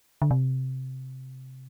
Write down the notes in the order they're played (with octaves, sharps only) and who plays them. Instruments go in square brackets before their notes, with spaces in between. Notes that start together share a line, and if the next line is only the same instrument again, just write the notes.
[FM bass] D3
C3